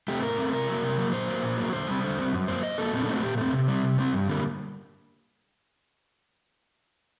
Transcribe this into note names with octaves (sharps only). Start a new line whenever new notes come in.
A3 C4 G4
A2 A#4
A3 C4
C3 A#4
F#3 A#3
C3
F#3 A#3
A#2 C5
F#3 A#3
A#2
F#3 A#3
D3 C5
G3 C4
D3
G3 C4
F#2
F#3 A#3 C5
F#2 D#5
F#3 A#3 A4
A#2 C4
D4
A3 C4 D#4
F#4
A#2 G4
A3 C4
C3
G3 C4
C3
G3 C4
G2
D3 G3 A#3